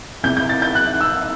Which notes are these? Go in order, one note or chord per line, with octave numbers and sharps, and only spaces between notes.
E2 C3 E3 G6
G6
A6
G6
F#6
E6